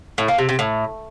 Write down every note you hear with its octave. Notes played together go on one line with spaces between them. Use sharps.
A2
A#3
C3
C3
A2